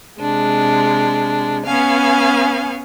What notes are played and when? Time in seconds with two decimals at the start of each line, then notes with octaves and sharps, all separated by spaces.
0.17 C3 G#3 D4
1.65 B3 C#4 F5 G#5